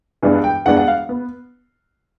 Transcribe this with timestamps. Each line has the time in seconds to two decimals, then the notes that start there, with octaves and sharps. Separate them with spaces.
0.22 G2 E3 G#3 B3 D4
0.44 G5
0.65 G2 E3 G#3 B3 D4 F#5
0.77 F#5
0.88 F5
1.09 B3